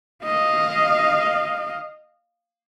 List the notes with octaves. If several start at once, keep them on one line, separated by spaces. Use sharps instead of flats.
D#5 F5